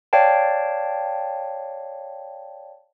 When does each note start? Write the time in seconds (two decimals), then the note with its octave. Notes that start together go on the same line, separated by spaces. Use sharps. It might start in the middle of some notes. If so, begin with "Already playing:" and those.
0.13 C#5 D5 F5 G5 A5